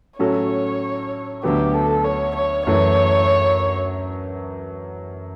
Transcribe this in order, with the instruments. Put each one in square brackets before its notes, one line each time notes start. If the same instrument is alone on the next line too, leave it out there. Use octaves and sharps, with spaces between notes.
[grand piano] A2 F#3 C#4 F#4 A4 [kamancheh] C#5
[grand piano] D2 D3 F#3 B3 [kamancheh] G4
[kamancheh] A4
C#5
C#5
[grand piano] F#2 E3 A3 [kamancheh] C#5